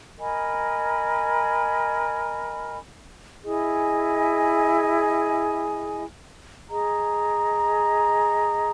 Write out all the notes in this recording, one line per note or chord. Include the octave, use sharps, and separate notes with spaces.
A#4 D#5 G#5 B5
E4 G#4 D#5 G#5
G#4 D#5 A#5